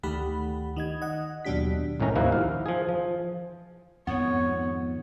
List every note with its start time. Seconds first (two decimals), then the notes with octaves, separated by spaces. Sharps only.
0.03 D2 D#3 A3 G4 F#5 B5
0.76 D#3 D#5 G#6
1.02 D#5 F#5
1.45 D#2 B2 F#3 D4 G4 B6
2.00 C2 A2 D#3 C#4 A#5
2.15 D#2 F3 A#3 D#4 E4 F#5
2.32 F5
2.66 F3 G#4
2.89 F3
4.07 F2 G#2 D#3 B3 C#5